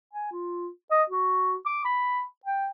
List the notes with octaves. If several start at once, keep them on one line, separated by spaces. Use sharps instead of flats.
G#5
F4
D#5
F#4
D6
B5
G5